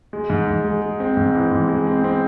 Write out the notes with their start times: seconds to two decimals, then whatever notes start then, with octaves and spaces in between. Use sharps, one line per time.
0.13 G#3
0.30 G#2
0.47 G#2
0.64 G#3
0.82 G#3
1.00 C4
1.17 G#2
1.35 E3
1.51 G#2
1.69 G#3
1.87 C4
2.04 C4